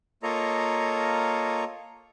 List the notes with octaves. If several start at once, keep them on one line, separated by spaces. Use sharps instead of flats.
A#3 F4 A4 C#5 D#5 A#5